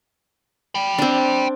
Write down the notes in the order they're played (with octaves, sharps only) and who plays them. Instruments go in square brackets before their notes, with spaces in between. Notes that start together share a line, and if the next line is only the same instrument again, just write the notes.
[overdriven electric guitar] G5 B5
[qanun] C4 D4